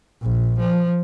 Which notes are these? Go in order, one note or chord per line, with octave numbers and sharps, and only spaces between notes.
A#1
F3